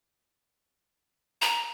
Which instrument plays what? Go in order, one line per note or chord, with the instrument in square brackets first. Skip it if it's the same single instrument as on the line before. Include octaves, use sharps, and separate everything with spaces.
[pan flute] A#5